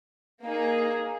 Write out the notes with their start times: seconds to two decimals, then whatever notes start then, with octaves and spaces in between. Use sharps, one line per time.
0.43 A#3 D#4 G#4